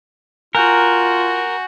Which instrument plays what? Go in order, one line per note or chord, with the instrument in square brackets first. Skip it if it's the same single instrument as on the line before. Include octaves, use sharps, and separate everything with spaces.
[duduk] F4 [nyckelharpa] F#4 [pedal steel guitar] A#4 [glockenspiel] G#5 F#6 G6